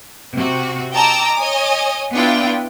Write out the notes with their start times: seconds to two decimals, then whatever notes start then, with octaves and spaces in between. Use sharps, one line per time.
0.33 C3 F#4
0.92 D#5 G5 A5 A#5 D6 E6
1.36 C#5 D#5 G#5 D#6
2.13 B3 D4 E4 F4 G5